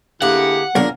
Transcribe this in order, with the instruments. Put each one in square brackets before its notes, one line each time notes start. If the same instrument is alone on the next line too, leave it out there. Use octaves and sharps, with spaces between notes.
[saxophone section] D3 E4 G4 [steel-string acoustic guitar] A#3 G#4 [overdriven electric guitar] F#5
[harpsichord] B1 [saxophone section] A#2 D4 [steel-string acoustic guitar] A#3 G#4 A#4